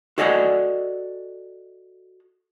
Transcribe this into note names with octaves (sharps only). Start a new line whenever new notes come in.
F#4 A4 D5 D#5 F#5 G#5